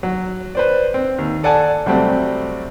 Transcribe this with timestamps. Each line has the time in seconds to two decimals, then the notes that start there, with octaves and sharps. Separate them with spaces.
0.03 F#3
0.55 B4 C5 D5
0.94 C4
1.18 D#2
1.43 A4 D5 F#5 G#5 A5
1.86 C3 F#3 G3 A3 C4